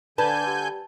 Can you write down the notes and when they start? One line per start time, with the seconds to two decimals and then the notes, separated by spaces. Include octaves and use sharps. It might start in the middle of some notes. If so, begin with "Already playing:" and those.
0.18 D3 D4 B4 G#5 A5 G6
0.47 G3